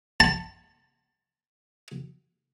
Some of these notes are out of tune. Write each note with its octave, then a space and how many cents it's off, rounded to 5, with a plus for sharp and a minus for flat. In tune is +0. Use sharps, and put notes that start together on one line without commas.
A5 +15